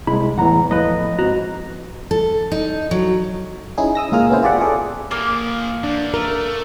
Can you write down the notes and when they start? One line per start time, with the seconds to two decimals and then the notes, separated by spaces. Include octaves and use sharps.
0.07 C2 G#3 E4 B5
0.38 E2 A2 E3 F#5 A#5
0.71 A2 F3 B4 D#5
1.19 G#2 C4 F#4 A#5
2.11 A4
2.52 D#4
2.91 F#3
3.78 C#4 D#4 E4 G#4
3.95 D#6 E6 A#6
4.12 C#2 A#2 F4 G#4 A#4 F6
4.30 B3 C#4 E4 C5
4.43 F4 G4 G#4 D5 E5 F#5
4.61 G#4 A4 D5
5.11 A#2 F3 A#3
5.84 E2 D4
6.14 A3 A#4